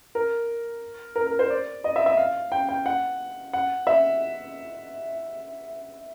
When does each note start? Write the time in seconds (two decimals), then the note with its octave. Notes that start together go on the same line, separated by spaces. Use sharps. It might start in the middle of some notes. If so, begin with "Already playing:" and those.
0.15 A#4
1.16 A#4
1.27 A#4
1.39 C5
1.50 D5
1.84 D#5
1.96 E5
2.06 E5
2.17 F5
2.52 G5
2.69 G5
2.86 F#5
3.53 F#5
3.87 E5